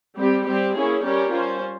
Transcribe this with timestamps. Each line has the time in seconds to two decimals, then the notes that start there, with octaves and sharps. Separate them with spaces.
0.17 G3 C4 G4
0.46 G3 C4 G4
0.74 A#3 C#4 E4 G#4 C#5
1.02 G3 C#4 G4 A#4 C#5
1.31 C#4 F4 C5